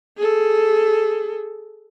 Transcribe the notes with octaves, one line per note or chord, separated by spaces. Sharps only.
G#4 A4